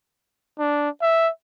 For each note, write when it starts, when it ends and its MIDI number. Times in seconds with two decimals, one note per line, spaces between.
0.58 0.89 62
1.01 1.30 76